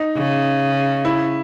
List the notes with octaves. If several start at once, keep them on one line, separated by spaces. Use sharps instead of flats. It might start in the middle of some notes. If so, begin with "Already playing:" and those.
Already playing: D#4
C#3
E4